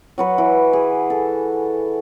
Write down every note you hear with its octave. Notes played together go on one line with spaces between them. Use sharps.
F#3 F#4 B4
E3
G#4
A4